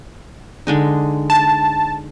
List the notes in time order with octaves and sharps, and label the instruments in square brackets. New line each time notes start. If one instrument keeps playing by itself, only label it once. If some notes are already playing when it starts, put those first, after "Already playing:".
[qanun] D3 G#3 D#4
[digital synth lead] A5